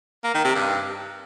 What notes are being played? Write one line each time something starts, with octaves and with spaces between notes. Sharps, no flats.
A#3
D#3
C3
G2